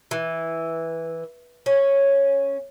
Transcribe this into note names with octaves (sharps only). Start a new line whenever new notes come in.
E3
C#4